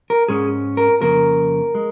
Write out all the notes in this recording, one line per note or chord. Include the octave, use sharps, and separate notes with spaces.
A#4
G#2 G#3 C#4 G#4
A#4
F2 C#3 A#3 A#4
G#3